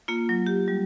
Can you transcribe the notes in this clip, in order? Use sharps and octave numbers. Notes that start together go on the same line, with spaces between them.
A#3 F4
F#3
G4
G3